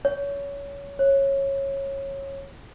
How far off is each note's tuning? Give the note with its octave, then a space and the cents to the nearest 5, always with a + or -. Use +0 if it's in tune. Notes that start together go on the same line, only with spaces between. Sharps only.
C#5 +25
C#5 -15